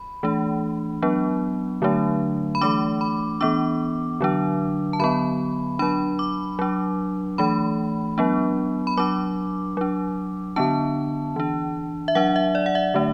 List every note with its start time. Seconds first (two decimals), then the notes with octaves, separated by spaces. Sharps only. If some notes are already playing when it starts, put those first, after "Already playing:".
Already playing: B5
0.23 E3 A3 D4
1.02 F#3 B3 D4
1.82 D3 F#3 A3 D4
2.55 B5
2.61 E3 A3 D4 D6
3.01 B5
3.41 E3 B3 D4 D6
4.21 D3 F#3 D4
4.93 A5
5.00 D3 F#3 B3 B5
5.79 F#3 D4 B5
6.19 D6
6.59 F#3 D4
7.38 E3 A3 D4 B5
8.18 F#3 B3 D4
8.87 B5
8.97 F#3 D4 D6
9.77 F#3 D4
10.56 D3 B3 D4 A5
11.36 E3 D4
12.08 E5
12.15 F#3 D4 F#5
12.36 E5
12.55 D5
12.66 F#5
12.75 E5
12.94 D3 A3 D4